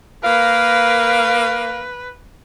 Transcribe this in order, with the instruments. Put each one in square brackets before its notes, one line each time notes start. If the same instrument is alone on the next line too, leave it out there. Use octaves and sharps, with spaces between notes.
[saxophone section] A#3 A#4 F5 [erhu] B4